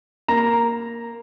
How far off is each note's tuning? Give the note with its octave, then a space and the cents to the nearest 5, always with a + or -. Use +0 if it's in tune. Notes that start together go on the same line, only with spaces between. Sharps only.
A#3 +0 A#5 +0